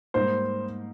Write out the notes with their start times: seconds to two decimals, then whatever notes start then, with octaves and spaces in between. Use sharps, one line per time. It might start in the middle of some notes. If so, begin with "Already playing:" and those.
0.14 G#2 G3 A#3 D#4 C5